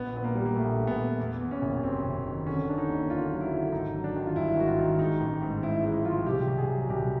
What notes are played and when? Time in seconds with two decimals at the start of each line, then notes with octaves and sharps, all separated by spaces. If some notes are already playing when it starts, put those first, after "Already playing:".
Already playing: A#1 B3
0.13 A#2 B3
0.24 A#3
0.35 G3
0.45 A#3
0.56 A#1 A3
0.77 A#1
0.87 B3
0.99 A#1
1.20 E2
1.40 E2
1.51 C#4
1.62 F#1
1.83 C3 C4
2.03 F#1
2.26 D#3
2.46 D3 C#4
2.67 D3 D4
2.78 D#4
2.88 D#2
3.10 D3 F4
3.30 F#3
3.41 E4
3.52 D3
3.72 G#1 D#4
3.94 F#3
4.04 D4
4.16 D#3
4.26 F4
4.36 G2 E4
4.57 G#1 F#4
4.67 F4
4.78 D#3
4.99 G#3 D#4
5.20 A1
5.42 G#2
5.63 G#2 E4
5.84 G#3 E4
6.05 F3 F4
6.26 C2 G4
6.47 C2
6.58 G#4
6.68 F#3
6.89 C2 G4